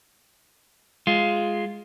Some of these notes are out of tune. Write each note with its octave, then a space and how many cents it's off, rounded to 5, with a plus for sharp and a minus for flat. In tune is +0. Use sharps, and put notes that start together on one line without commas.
G#3 +0 F4 +0